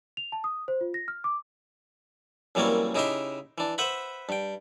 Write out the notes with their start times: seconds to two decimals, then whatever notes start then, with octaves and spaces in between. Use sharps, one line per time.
0.17 F7
0.32 A5
0.44 D#6
0.68 C5
0.81 F4
0.94 A#6
1.08 F6
1.24 D6
2.55 F#2 E3 G3 A#3 C4 C#5
2.95 C#3 D#4 E4 G4 E5 C6
3.58 E3 D4
3.78 B4 C5 E5 F#5 B5
4.29 G2 G5